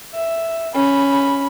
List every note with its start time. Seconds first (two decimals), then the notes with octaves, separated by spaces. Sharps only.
0.15 E5
0.75 C#4 B5